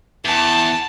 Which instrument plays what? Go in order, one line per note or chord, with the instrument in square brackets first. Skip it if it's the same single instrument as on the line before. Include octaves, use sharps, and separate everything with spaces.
[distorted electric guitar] E2 [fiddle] A5